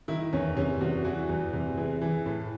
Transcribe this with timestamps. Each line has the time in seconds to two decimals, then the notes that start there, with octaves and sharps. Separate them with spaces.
0.08 D#3 E4
0.33 E2 C#4
0.57 C3 C#4
0.81 E2 F#4
1.05 E3 F#4
1.29 E2
1.53 C3
1.77 E3 G#4
2.02 E3
2.26 A2